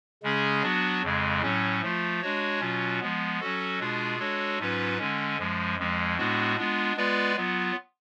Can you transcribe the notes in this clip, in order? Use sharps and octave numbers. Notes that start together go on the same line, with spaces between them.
C#3 G#3 C#4 G#4
F#3 B3 D4 F#4
F2 C#3 G#3
A2 F#3 C#4
F3 A3 F4
G#3 D4 F#4 C#5
B2 F#3 C#4 F4
F3 G#3 B3
F#3 C#4 F#4 A4
B2 G#3 D4 F4 G#4
G#3 D4 F#4 A4 C#5
G#2 F#3 C#4 F4 B4
D3 G#3 C#4
F#2 F3 G#3
F2 F3 G#3
A2 G#3 B3 D4 F#4
G#3 B3 D4 F4
G#3 B3 F4 B4 D5
F#3 B3 F4